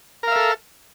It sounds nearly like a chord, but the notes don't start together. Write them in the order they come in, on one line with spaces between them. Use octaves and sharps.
A#4 F5 E5 A4